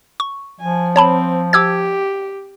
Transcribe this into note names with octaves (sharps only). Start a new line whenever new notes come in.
C#6
F3 G#5
C4 C#5 A5 B5
G4 D6 E6 G#6